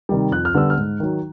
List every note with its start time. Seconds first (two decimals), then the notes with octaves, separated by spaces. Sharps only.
0.09 C3 D#3 G3
0.31 F2 F#6
0.45 F6
0.54 D3 G3 B3 E6
0.70 F6
0.78 G#2
1.00 D#3 F#3